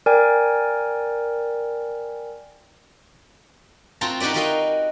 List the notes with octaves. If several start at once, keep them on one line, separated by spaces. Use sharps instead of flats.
A#4 D5 G5 G#5
C4 F4 F#4 C5 A5 A#5
D#4 F#4 G4 B4 D5
F#4 A#4 B4 D#5 F5 G5